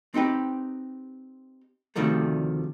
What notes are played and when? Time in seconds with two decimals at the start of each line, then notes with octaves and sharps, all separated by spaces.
0.14 C4 D#4 G4 B4
1.96 D2 C3 D#3 F3 G3 A3